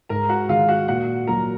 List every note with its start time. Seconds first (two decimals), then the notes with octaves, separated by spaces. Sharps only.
0.09 G#2 A#4 A#5
0.29 F#4 F#5
0.49 D#3 G#3 F4 F5
0.69 F#4 F#5
0.88 A#2 F#4 F#5
1.27 F#3 A#3 F4 A#4 A#5